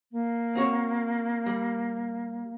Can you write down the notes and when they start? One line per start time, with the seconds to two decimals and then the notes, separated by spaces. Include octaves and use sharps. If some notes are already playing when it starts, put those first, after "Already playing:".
0.12 A#3
0.55 C4 F#4 C#5
1.46 G3